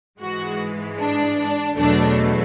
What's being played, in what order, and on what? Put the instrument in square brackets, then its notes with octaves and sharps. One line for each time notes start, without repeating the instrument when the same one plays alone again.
[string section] G#2 E3 G#3 F#4
D4
E2 B2 F#3 A3 D4